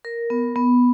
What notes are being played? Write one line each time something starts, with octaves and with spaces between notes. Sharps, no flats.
A#4
B3
B3